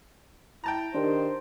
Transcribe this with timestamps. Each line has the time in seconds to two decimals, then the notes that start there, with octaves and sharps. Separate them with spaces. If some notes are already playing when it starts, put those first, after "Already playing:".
0.64 E4 G5 A5 A#5
0.94 D#3 D4 G4 A#4 C5